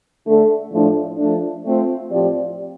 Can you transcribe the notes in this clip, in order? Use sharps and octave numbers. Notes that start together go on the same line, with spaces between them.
D3 A3 D4 A4
A2 F3 A3 D4
F3 A3 D4
A3 C4 F4
A2 F3 C4 G4 D5